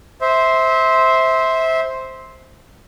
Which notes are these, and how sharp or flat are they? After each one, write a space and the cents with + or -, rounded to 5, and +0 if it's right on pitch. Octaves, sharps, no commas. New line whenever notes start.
C5 +0 E5 -25